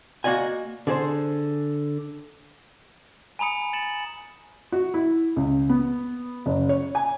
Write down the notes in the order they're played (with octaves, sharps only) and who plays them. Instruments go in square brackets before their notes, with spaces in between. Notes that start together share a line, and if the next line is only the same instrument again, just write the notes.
[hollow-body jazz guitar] A#3 F#4 D5 D#5 G#5
D3 G#4 C5
[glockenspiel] G#5 A#5 B5 D#6 C#7
A6 C#7 E7 F#7
[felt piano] F#4
E4
C#2
B3
F#1
C#5
G#5